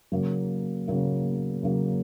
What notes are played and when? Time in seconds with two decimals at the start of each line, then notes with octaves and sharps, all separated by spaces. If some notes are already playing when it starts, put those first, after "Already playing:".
0.12 C#3 F#3 A#3
0.88 C#3 F#3 A#3
1.63 C#3 F#3 A#3